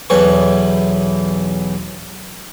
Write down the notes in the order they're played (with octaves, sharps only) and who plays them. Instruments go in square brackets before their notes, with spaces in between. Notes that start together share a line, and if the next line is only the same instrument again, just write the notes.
[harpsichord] B1 E2 E3 C#5 C#6